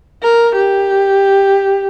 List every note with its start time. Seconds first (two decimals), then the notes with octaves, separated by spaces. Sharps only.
0.23 A#4
0.56 G4